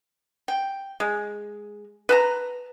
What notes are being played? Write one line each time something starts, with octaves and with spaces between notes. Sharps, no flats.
G5
G#3
B4 A5 A#5